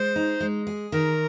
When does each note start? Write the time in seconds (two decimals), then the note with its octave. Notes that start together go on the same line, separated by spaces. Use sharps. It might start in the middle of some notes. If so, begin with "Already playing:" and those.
Already playing: G#3 C5
0.16 D#4
0.40 G#3
0.67 G#4
0.92 D#3 A#4